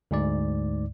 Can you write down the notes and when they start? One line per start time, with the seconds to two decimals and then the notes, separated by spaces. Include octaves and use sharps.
0.11 D2 G#2 D5